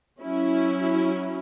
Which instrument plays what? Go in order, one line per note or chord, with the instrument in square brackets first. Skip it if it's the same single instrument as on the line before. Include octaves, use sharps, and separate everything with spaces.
[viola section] F#3 C#4 E4